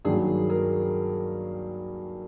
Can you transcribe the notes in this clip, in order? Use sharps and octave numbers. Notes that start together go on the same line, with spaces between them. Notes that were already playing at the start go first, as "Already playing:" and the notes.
G2 D#3 F#3 A#3 G#4
G#4 A#4